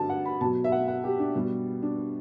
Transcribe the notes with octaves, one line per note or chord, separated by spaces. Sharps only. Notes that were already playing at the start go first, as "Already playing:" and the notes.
Already playing: G2 D3 F#3 A5
F#5
B5
B2 F#3 A5
E5
F#5
F#5
G4
D4
B2 G3
D4